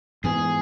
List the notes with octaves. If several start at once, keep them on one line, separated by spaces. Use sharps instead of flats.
G#2 E3 B3 G#4